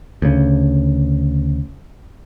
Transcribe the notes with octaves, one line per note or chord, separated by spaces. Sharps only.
D2 C#3